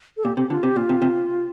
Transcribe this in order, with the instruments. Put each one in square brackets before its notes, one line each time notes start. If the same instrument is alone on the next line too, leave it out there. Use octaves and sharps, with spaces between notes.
[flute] A4
[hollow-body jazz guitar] A#2 [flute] G4
[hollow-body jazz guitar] C3 [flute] G4
[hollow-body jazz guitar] D3 [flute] F4
[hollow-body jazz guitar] C3 [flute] G4
[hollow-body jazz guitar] A#2 [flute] F4
[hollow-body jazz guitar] C3
C3